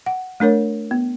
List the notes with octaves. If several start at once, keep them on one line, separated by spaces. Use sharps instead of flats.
F#5
A3 D4 A#4 C#5
B3